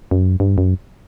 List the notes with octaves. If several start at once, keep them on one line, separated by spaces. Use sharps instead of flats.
F#2
G2
F#2